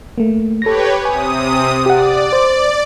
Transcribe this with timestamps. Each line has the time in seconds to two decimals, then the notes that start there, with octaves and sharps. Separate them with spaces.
0.18 A3 A#3
0.62 G4 A4 B4 C#5 A#6
1.05 C3 G#5 D#6
1.86 G4 D5 F#5
2.33 C5